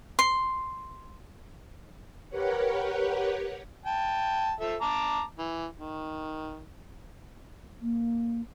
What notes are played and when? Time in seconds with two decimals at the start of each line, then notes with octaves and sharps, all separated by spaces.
0.19 C6
2.29 G4 A#4 B4 C#5 F#5
3.86 G5 A5
4.60 F3 A4 E5
4.81 A5 A#5 D6
5.38 E3
5.78 D#3
7.81 A#3